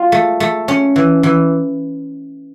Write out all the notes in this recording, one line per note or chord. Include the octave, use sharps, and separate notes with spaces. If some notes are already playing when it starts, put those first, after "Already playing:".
Already playing: F4
A3
A3
C#4
E3
E3